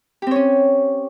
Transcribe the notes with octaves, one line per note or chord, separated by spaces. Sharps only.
C4 C#4 G4 C#5